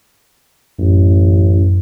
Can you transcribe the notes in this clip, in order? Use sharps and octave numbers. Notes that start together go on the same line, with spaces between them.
A1 F#2